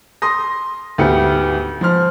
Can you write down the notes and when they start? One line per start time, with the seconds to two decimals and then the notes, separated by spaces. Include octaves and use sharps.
0.22 C6 D#6 A#6
0.98 D2 G#2 B3 G4 B4 C#7
1.81 F3 C6 F6